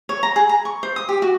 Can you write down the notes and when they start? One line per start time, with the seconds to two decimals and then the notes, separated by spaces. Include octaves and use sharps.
0.09 C#5
0.23 A#5
0.36 G#4
0.49 A#5
0.65 C#6
0.83 C5
0.96 D#6
1.09 G4
1.22 F#4